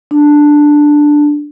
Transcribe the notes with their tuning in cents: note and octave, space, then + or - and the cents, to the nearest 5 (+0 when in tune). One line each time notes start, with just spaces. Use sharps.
D4 +5